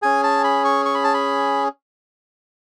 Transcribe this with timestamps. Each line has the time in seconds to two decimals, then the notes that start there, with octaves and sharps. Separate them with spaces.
0.02 C#4 G#4 G#5
0.24 A5
0.44 B5
0.65 C#6
0.86 C#6
0.94 B5
1.04 A5
1.14 B5